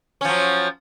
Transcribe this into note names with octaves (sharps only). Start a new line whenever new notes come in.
F3 F#3 C#4